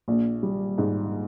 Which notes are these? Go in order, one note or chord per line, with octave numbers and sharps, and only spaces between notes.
A#1
G3
G#2